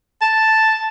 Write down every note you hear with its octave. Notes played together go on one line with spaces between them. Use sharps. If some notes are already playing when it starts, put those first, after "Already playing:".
A5